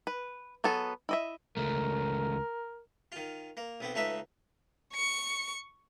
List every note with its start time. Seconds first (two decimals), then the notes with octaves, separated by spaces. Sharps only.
0.07 B4
0.64 F#3 B3 G#4 A4
1.09 E4 D#5 E5
1.57 C#2 A3 A#4
3.12 D#3 F4
3.57 A#3
3.81 B1 B3 C4
3.94 C#2 A3 D#4 B4 E5
4.94 C#6 C#7